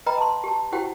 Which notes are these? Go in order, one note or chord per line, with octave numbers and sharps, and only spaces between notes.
B4 D#5 G5 A#5 B5
A5 C6
G4 A5
E4 F#4 G4 C5 F#5 G5